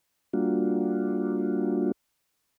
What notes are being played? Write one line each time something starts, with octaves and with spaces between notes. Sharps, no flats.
G3 A#3 D4 F4 F#4